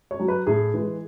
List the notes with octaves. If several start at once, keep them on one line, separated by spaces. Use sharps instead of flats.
C#5
F#3
B4
A2 G#4
E3 G#3